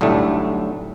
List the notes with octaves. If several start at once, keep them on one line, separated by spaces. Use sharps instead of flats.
B1 A2 D3 G3 A3